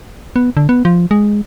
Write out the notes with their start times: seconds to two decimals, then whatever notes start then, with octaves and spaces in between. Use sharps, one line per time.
0.36 B3
0.57 D3
0.69 B3
0.85 F3
1.11 G#3